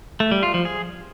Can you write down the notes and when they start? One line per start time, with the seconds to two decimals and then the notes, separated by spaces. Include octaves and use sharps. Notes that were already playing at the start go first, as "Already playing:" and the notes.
0.20 A3
0.31 G3
0.43 F4
0.54 F3
0.65 G#4